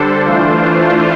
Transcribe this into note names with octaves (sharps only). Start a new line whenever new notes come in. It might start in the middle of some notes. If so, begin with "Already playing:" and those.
Already playing: D3 G3 D4 A4 C5
E3 A3 D4 F4 C5